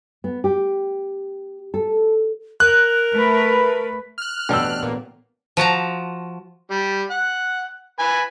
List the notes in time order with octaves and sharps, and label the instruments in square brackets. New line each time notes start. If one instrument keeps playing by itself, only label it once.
[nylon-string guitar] B3
G4
A4
[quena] A#4 [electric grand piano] F#6
[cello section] A3 B4
[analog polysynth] F6 F#6
[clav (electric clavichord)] A1 D4 G5 [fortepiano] B2 E6 [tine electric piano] B3
[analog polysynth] A#2
[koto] F3 F#4 A5 A#5
[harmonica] G3
F#5
B4 G#5